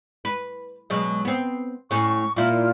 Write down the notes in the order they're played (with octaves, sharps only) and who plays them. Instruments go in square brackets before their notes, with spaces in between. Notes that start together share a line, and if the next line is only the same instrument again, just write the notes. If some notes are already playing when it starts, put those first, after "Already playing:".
[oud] B4
B2 F#3 G#3
B3 C4
[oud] A2 C#4 [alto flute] C#6
[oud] A#2 E4 [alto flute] F4